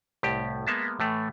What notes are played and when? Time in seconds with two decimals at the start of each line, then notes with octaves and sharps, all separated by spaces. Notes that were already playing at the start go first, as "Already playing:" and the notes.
0.23 C2 A2 G4
0.67 G#3 A#3 B3 E5 A5
1.00 A2 E3 A3